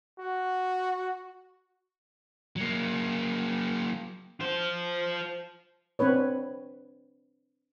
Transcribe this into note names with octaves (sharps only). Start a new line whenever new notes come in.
F#4
F#3 A#3
F4 C5
C4 D4 B4 C#5